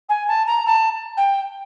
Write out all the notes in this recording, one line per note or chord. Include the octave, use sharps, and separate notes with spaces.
G#5
A5
A#5
A5
G5